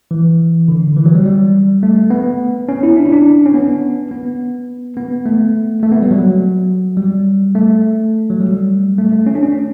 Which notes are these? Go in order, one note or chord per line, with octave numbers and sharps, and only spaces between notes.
E3
D3
E3
F#3
G3
G3
A3
B3
C#4
E4
D4
E4
D4
C#4
B3
B3
B3
A3
A3
B3
G3
F#3
G3
A3
F#3
G3
A3
A3
C#4
D4
C#4